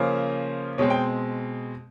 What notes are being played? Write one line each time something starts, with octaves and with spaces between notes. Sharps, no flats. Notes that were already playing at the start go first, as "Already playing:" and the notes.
Already playing: C#3 F3 A#3 C#4 C5
B2 G#3 C4 C#5
G5